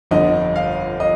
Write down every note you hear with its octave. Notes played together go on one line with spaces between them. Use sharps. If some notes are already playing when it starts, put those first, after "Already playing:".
G1 F2 D3 D#5
F5
D#5